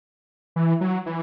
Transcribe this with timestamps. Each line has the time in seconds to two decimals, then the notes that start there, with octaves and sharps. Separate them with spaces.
0.56 E3
0.81 F#3
1.06 E3